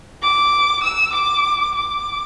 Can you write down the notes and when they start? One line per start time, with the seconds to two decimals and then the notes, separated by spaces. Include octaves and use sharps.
0.22 D6
0.84 E6
1.13 D6
1.75 D6